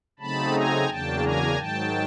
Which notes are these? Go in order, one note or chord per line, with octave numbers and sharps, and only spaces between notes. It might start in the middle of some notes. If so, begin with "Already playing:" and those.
C#3 F#3 A3 C4 D#4 A5 B5
G#5 A#5
E2 C#3 F#3 A#3 D4 G5 A5
G#5 A#5
G#2 D#3 F#3 G5 A5